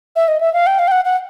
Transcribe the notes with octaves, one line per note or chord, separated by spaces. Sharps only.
E5
D#5
E5
F5
G5
F5
G5
F#5
F#5